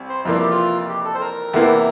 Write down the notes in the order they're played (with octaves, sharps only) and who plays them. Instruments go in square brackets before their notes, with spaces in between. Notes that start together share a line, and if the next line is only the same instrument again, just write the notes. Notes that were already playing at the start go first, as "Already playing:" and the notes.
Already playing: [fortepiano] C2
[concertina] C5
[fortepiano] F2 C3 E3 G3 A#3 [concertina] F4
[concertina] G4
F4
G4
A4
C5
A#4
[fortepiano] E2 C3 E3 A#3 E4